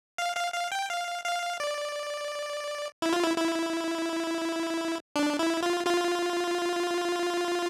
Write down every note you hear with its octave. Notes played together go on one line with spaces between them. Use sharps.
F5
F5
F5
G5
F5
F5
D5
E4
F4
E4
E4
D4
E4
F4
F4